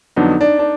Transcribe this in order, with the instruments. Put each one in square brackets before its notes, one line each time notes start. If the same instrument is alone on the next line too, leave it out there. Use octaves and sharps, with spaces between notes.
[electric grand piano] F2 D3 F#3 B3 D4 [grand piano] D#4
[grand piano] D4
D4